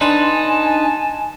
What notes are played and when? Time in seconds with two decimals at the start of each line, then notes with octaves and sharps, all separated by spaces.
0.01 D4 D#4 B4 G#5 A5 C6